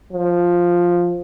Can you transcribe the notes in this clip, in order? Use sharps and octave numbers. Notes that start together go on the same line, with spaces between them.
F3